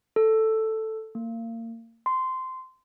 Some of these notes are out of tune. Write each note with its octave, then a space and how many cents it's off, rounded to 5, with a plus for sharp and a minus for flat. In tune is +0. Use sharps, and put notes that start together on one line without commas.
A4 +5
A#3 -30
C6 -15